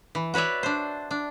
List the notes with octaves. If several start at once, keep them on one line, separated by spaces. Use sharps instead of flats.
E3
F#4 B4 C#5 D5 E5
D4 C5
D4